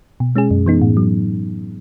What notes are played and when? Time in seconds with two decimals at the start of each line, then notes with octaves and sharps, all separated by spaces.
0.20 B2
0.35 G#3 C#4 G#4
0.51 F#2
0.66 E3 B3 D#4
0.82 A2
0.97 F#3